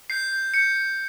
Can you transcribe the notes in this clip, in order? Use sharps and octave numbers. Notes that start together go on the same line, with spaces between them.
G6 C7
G6
G6 C#7
G6